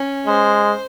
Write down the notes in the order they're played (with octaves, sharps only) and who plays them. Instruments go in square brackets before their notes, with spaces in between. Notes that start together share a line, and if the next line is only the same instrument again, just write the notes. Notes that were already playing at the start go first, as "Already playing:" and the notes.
Already playing: [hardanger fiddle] C#4
[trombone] G#3 [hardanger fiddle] C5